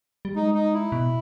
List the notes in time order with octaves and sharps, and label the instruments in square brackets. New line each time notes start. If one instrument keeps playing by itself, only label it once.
[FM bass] G3
[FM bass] G#3 [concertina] D#4
[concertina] D#4
E4
[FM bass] B2